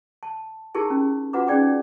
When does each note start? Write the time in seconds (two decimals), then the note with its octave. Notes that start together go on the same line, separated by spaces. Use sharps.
0.23 A5
0.75 D#4 E4 G4 G#4 A#4 A5
0.90 C#4
1.33 F4 F#4 B4 F#5 A#5 D6
1.47 C#4 D#4 G#4 D5 G5 D6